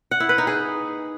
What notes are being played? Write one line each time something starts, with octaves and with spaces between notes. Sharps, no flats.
F#5
E4
B4
D#4
G#4